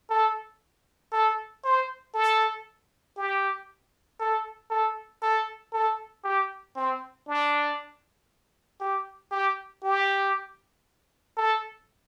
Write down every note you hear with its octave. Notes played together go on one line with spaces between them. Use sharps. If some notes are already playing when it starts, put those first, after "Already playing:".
A4
A4
C5
A4
G4
A4
A4
A4
A4
G4
C4
D4
G4
G4
G4
A4